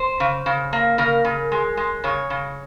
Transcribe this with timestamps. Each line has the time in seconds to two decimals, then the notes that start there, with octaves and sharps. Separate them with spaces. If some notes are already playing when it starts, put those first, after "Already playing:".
Already playing: C5
0.20 C#3
0.46 C#3
0.73 A#3
0.98 C#3 A#4
1.25 C#3
1.52 G#3
1.77 G#3
2.04 C#3 C#5
2.30 C#3